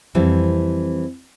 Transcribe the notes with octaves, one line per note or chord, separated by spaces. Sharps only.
F2 E3 G3 C4